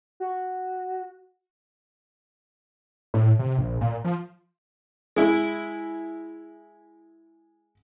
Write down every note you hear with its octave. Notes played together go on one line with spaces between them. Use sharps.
F#4
A2
C3
A#1
A#2
F3
G#3 E4